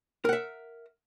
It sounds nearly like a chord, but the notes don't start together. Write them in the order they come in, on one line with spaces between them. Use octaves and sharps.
A#4 F#5 E5